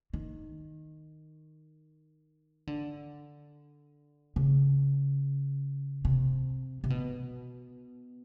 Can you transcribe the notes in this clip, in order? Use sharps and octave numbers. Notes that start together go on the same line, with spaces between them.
D#3
D3
C#3
C3
C3
B2